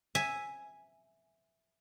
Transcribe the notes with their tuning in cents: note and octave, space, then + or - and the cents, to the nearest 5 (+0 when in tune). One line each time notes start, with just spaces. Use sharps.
E5 +0 G#5 +0